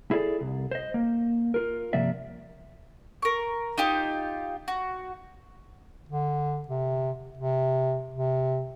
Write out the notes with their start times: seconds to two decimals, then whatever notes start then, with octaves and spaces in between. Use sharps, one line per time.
0.11 E4 G#4 A4 D5
0.40 C2
0.71 C5 D#5
0.94 A#3
1.54 F4 A#4
1.93 G2 C3 F3 A#3 D5 E5
3.22 A#4 C#6
3.78 D#4 F4 G4
4.68 F#4
6.09 D3
6.68 C3
7.37 C3
8.14 C3